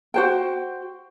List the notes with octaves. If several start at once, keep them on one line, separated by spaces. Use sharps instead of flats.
F#4 C5 G5